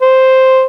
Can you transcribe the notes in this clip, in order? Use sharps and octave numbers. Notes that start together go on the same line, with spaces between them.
C5